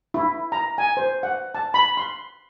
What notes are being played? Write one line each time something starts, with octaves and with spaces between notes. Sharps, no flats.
E4
A#5
G#5
C5
F#5
A5
B5
C6